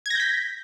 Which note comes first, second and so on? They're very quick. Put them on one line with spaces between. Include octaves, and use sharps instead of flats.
G#6 A#6 G6 B6